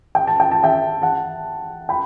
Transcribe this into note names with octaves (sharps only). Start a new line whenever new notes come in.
G5
A5
G5
A5
E5 G5
F#5 A5
G5 B5